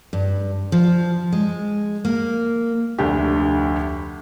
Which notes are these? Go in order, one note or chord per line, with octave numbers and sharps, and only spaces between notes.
G2
F3
G#3
A#3
F1 D2 D4 G4